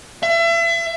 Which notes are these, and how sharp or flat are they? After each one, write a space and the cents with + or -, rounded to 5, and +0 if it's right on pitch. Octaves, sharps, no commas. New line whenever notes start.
E5 +35